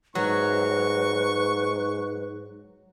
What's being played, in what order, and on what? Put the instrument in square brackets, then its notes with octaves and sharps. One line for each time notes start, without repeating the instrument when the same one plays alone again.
[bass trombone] G#2 [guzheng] F#3 [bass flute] B4 [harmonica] C#6